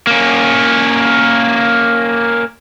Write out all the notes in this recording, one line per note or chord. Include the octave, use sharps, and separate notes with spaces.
A#3 C#4